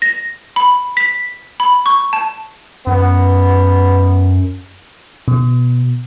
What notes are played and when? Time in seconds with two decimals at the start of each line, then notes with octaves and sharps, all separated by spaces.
0.02 A#6
0.56 B5
0.97 B6
1.60 B5
1.86 C#6
2.13 A5
2.87 F#2 B3
5.28 B2